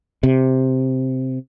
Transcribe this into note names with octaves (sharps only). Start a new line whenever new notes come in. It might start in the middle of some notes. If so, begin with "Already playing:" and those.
C3